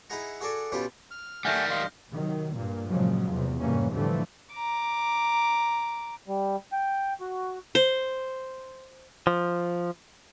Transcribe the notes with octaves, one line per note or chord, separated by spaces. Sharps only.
D#4 E4 G#4 F#5 A#5
F#4 G#4 A4 D5
B2 G3 C#4 F4 G4
F6
D#3 G3 A3 F#5 G#5 F6 G6 A#6
D#5 F5 C6
C3 D#3 F#3
G2 A#2 A#3
A#2 C#3 F3 F#3 G#3
E2 C3
F1 G#2 E3 G3 A#3 C#4
A2 D3 E3 F3 G3 A3
A#5 D6
G3
G5
F#4
C5
F3